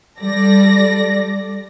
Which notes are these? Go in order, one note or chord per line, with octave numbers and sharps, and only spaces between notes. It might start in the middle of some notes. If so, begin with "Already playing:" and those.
G3 A4 D5 A#6